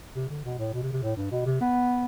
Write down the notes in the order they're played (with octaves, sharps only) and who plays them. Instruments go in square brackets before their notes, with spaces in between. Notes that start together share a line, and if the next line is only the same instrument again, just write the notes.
[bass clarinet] C3
D3
B2
A2
B2
C3
C3
A2
G2
B2
C3
B3